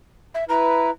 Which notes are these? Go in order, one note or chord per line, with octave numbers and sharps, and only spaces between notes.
E5
E4 B4 A#5